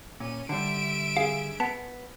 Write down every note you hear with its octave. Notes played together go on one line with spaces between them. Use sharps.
A#2 C#4 D#7
D3 G3 E5 D7
G#4 F5
B3 A5